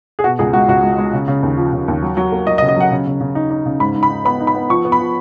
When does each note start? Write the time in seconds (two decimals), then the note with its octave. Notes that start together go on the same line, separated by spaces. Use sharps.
0.19 G#4
0.24 B2 F#4
0.39 C#2 G#4
0.53 G#3 F#4
0.68 C#2 F#4
0.83 G#3
0.98 G#3
1.13 C#3
1.28 C#3
1.43 D#2
1.57 F3
1.73 C#3
1.88 D#2
2.02 F#3
2.17 F#3
2.32 A#3
2.47 F#3 D#5
2.58 D#5
2.62 C#3
2.69 D#5
2.76 F#3 F#5
2.91 C#3
3.06 C#3
3.21 C#3
3.35 D#4
3.50 D#4
3.66 C#3
3.80 G#2 B5
3.95 G#2
4.03 B5
4.10 D#4
4.25 B3 B5
4.40 D#4
4.47 B5
4.55 B3
4.69 F3 C#6
4.85 B3
4.92 B5
4.99 F3